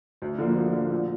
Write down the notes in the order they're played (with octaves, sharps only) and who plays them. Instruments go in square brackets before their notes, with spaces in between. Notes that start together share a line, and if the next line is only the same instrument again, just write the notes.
[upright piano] D2
D3 F3 A#3
D2
D3 F3 A#3
A#2